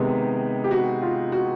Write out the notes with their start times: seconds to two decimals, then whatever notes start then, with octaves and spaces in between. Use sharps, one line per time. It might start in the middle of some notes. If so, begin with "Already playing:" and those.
Already playing: C3 D#3 G#3 B3 D#4 G4
0.64 G4
0.71 F#4
1.02 F4
1.32 F#4